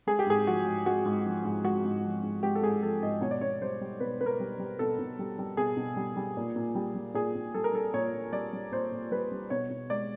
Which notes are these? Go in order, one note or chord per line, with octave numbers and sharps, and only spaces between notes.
G#3 G#4
G4
G#2 G#4
F3 F#4
G#2
G#3 F#4
G#2
F3
G#2
G#3 F#4
G#2
F3
G#2
G#3 G4
A4
G#2 G#4
F3 A4
G#2 D#5
B2 C#5
D5
B2 C#5
G3 C5
G3
B2 B4
B2 B4
A#4
G3
G3
B2 A4
B2
G3
G3
B2 G#4
B2
G3
G3
A#2
A#2
G3
G3
A#2 G#4
A#2
G3 A4
A#4
G3 A4
A#2 C#5
A#2
G3 D5
G3
A#2 C5
A#2
G3 B4
G3
B2 C#5
B2
G#3 D5